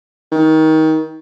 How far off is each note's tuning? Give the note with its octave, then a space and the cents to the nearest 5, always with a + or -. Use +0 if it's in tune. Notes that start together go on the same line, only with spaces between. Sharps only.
D#3 +25